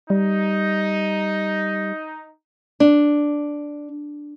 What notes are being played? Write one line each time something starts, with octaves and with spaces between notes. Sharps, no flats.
G3 D#4
D4